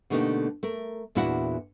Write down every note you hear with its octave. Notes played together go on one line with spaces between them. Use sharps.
B2 D3 A3 A#3 D#4 G4
A3 A#4
E2 A#2 D4 E4 F#4 F#5